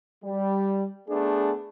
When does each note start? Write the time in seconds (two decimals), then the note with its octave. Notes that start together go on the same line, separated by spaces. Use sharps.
0.24 G3
1.08 A3 B3 D4 G#4